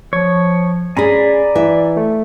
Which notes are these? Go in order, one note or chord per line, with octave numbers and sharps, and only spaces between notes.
F3 C#5 G#6
C#4 G#4 D5 G#5 A#5 B5
E3 E5
A3